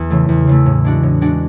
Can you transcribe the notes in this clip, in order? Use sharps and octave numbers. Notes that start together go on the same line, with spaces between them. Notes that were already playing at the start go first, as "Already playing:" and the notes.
Already playing: E2
C#3 E3 A3
E2
C#3 E3 A3
A2
G#3 D4 F#4
A2
G#3 D4 F#4